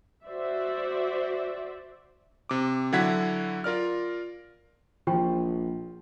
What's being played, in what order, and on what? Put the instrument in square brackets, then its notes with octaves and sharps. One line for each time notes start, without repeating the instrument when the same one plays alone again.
[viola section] F#4 C5 D5 E5
[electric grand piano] C3 D6
D3 F#3 E4 F#5 G#6 B6
F4 A#4 D5 F6
[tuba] A#1 [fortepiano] F3 [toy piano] G5 B5 C#6